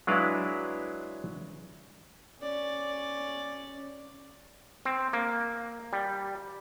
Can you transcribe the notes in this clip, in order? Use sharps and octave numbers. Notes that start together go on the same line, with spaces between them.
F#3 G#3 D4 E4 B4 F5
C#4 D5
C4
A#3
G3